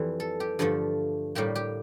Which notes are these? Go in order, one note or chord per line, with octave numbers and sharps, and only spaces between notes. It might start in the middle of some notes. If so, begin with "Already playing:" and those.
Already playing: F2 E3 G3
A4
G4
G2 D3 F3 A3
A2 G3 A#3 G4
G4